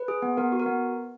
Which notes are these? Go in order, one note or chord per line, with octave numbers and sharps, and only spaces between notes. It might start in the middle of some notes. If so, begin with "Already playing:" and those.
Already playing: B4
G#4
B3
B3 A#4
F#4
A#4
B3